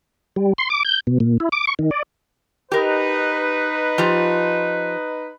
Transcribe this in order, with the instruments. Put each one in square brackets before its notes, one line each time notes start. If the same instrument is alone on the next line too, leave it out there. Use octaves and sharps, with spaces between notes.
[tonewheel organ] G3
C6
D6
G6
B2
A#2
E4
D6
C#6
D#3
D5
[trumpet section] D#4 B4 [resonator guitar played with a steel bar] G4 A#4
[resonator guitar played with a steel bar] F3 F4 G4